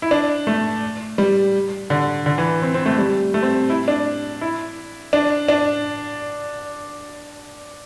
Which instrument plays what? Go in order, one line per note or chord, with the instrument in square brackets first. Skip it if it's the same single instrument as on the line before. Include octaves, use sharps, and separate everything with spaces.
[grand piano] E4
D4
A3
G3
D3
D3
E3
C4
C4
A3
G3
A3
C4
E4
D4
E4
D4
D4